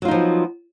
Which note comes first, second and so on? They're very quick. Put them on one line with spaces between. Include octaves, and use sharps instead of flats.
F#3 F4 D#4 F3 B3